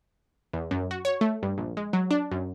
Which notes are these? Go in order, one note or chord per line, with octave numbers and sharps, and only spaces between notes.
E2
F#2
F#4
C#5
A3
G2
A#1
G#3
F#3
D4
F#2